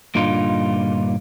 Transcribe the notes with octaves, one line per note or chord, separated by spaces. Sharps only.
G2 A#2 D3 D#4 F4